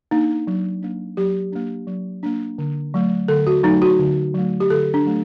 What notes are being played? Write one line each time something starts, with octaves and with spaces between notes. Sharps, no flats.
A#3 D4 D#4
F#3
A#3 D4
F#3 G4
A#3 D4
F#3
A#3 D4
D3
F#3 A3
D3 A4
F#4
F#3 A3 D#4
F#4
D3
F#3 A3
G4
D3 A4
D4
F#3 A3